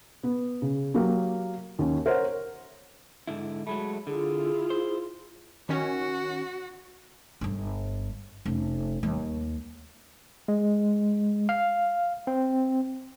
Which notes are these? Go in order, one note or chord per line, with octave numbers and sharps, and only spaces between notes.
B3
C#3
F#3 A#3 G4 A#4
D#2 C#4
A#4 C5 C#5 F#5
G#2 D3 E4
F#3 G#3 A3 B5
D3 E4 F4 G#4
C5
D#3 C#4 F#4
G1 G2
F1 C#4
D#2 G3
G#3
F5
C4